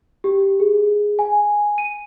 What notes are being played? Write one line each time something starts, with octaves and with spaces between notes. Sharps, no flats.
G4
G#4
G#5
D#7